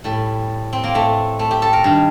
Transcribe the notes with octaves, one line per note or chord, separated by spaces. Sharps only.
A2 G3
C4
A#3
A2 A3
A3
G4
A4
A#4
G2 D#3